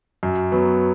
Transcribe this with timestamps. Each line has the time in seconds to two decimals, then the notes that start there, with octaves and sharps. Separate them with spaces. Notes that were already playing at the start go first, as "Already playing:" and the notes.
0.23 F#2
0.52 F#3 B3